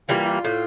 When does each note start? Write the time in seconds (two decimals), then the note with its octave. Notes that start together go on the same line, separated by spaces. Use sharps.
0.09 E3 G3 A#3 F4
0.26 F4
0.45 A2